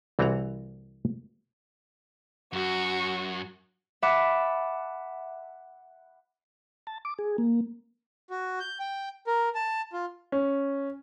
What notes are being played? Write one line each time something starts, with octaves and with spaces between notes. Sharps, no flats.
C2 E3 C4 F#4 F#5 A#5
F#2 F#4
E5 F#5 A5 B5 D6
A5
D6
G#4
A#3
F#4
G6
G5
A#4
A5
F4
C#4